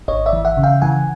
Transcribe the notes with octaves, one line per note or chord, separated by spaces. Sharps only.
G#1 C#5 D#5
D5 E5
E3
E5 F#5
C#3
F5 G5
E3 F#5 G#5